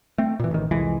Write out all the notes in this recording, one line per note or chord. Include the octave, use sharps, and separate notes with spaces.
A3 C4
A#2 E3
A1 D#3
C2 F2 E3 G#3